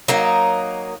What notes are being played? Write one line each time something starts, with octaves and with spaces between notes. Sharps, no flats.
F#3 A#3 D#4